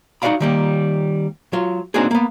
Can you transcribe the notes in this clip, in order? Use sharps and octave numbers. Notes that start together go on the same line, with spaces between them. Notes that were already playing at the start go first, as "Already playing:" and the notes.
D#4 F#4 B4 D5 F5 B5
D#3 G3 A#3
F#3 F4
A#3 C4 D4 D#4 F#4 G#4
A#3 B3